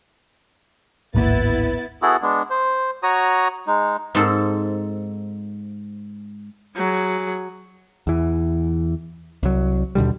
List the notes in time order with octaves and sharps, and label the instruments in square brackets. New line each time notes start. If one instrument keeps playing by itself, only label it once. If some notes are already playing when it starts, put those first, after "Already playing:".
[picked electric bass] D1 G#1 A#3 [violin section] B3 E4 A6
[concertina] B3 E4 F#4 G#4 A4
G#3 B3 D4
C5
F#4 C#5 A#5 D#6
G#3 D#4
[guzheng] G#2 C4 A4
[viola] F#3 G#4
[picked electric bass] E2 E3
C2 F#3
D#2 B2 D3 G3